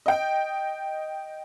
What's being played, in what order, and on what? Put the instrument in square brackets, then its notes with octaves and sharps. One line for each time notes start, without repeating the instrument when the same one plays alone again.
[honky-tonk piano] D#5 G5